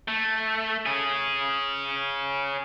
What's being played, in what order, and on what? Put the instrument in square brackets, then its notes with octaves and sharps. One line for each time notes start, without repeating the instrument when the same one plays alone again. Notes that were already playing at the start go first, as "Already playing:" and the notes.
[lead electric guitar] A3
C#4 G#4